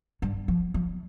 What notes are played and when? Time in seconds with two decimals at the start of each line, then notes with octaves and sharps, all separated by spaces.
0.22 G2
0.48 F3
0.74 F3